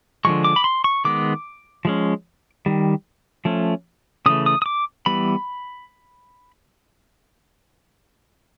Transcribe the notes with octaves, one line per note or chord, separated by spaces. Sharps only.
D3 F3 G#3 C#6
D6
B5
C6
C#6
D#3 G#3 B3 D6
F3 G#3 C#4
D#3 G3
F3 A3 C#4
C#3 E3 A3 D#6
D#6
D#6
D6
E3 G3 B3 B5